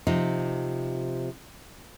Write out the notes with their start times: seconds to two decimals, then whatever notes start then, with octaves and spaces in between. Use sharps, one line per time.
0.07 C3 F3 D#4